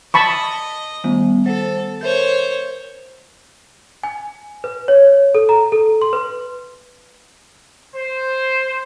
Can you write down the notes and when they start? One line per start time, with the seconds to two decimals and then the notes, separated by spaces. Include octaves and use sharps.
0.14 D#5 A5 B5 C#6
1.04 D#3 G3 B3
1.46 A4 C5
2.01 A#4 C5 C#5 G6
4.03 G#5
4.64 B4
4.88 C#5
5.35 A4
5.49 A#5
5.72 A4
6.02 C6
6.13 B4
7.95 C5